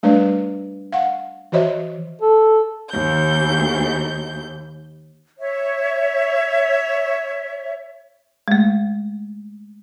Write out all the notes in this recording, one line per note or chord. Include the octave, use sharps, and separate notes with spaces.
G3 A3 D4 B4 D5 F5
F5 F#5
E3 F#4 C5 C#5 D#5 E5
A4
D#2 G6
C#5 E5
G#3 A3